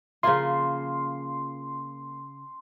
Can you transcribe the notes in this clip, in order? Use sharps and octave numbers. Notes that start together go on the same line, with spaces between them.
C#3 F3 A#3 F4 C6